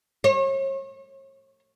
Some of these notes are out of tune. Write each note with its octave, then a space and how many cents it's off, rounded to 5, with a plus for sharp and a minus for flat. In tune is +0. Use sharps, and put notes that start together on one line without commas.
C#5 -40